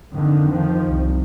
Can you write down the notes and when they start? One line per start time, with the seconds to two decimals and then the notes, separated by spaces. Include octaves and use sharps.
0.13 F2 D3 D#3
0.51 D#3 F3
0.87 C2